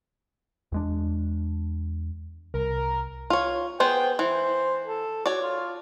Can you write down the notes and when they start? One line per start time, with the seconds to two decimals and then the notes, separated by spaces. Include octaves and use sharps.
0.72 E2 G#3 D4
2.54 C2 A#4
3.30 F4 C#5
3.80 B3 G#4 C5 G5
4.19 E3 C5
4.87 A4
5.26 F#4 C#5 D5
5.41 F4